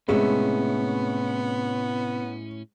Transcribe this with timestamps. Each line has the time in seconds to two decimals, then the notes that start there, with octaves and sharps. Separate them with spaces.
0.09 A2 C3 G#3 B3 C#4 E5